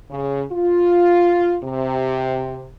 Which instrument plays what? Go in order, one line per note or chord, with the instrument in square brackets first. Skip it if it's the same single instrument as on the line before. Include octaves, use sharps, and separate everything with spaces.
[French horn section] C#3
F4
C3